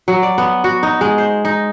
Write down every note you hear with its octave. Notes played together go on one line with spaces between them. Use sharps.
F#3
D5
B3
F#4
D#4
G#3
C5
D#4